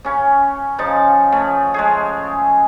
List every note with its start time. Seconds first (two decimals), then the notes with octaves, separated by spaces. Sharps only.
0.04 C#3 C#4
0.79 C#3 F3 D#4 A5
1.32 A3 C#4
1.74 G#3 A3 G#4